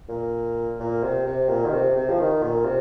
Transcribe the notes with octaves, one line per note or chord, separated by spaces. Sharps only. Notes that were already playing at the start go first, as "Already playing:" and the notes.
A#2
A#2
C3
C3
A#2
D#3
C3
C3
F3
D#3
A#2
C3